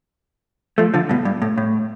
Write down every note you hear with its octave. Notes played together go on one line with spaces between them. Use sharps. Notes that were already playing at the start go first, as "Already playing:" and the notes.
F3 A3
D3 F3
G2 B2
G2
A2
A2